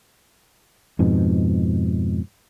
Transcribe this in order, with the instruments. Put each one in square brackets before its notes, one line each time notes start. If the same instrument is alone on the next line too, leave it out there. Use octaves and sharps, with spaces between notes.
[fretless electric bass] F2 G#2 B2